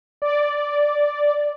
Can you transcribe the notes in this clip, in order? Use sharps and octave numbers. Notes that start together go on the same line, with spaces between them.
D5